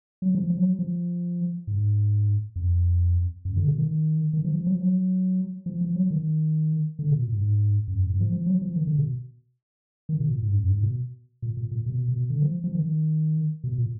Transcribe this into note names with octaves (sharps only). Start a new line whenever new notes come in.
F#3
F3
F3
F#3
F3
G#2
F2
F#2
D3
B2
D#3
D#3
F3
F3
F#3
F3
F#3
F3
F3
F#3
D#3
D3
B2
A#2
G#2
F#2
F#2
G#2
F3
F3
F#3
F3
D#3
D3
B2
D#3
B2
A#2
G#2
F#2
G#2
B2
A#2
A#2
A#2
B2
B2
D3
F3
F3
D#3
B2
A#2